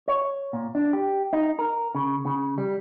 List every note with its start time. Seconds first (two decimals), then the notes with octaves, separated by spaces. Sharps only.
0.08 C#5
0.53 A#2
0.75 D4
0.93 G4
1.33 D#4
1.59 A#4
1.95 C#3
2.25 C#3
2.58 G3